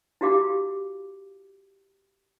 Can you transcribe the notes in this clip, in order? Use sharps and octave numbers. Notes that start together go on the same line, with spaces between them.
E4 F#4 G4 F5 D6